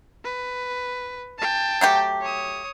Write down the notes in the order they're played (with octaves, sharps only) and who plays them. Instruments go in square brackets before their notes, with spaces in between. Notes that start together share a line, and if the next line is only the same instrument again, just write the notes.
[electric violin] B4
G5 A5
[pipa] F#3 A3 G4
[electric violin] C#5 D#6